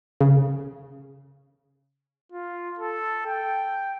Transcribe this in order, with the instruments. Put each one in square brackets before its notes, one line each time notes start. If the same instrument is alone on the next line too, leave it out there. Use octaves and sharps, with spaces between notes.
[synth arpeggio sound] C#3
[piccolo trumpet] F4
A4
G5